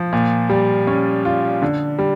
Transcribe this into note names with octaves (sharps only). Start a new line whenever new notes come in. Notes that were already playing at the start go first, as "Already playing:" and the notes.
Already playing: F3
A#2
G3
C#4
F4
D3
G3